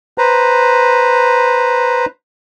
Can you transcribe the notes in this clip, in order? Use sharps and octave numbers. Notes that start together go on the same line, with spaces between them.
B4 C5 A#5